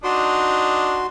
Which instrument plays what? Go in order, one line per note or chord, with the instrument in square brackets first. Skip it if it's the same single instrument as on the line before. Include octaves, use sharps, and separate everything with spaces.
[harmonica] D4 D#4 [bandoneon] F#4 C6